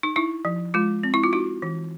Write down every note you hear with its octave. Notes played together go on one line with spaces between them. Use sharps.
D#4
D#4 E4
F3
G#3 F4
C4
E4
F4
D#4 F#4
E3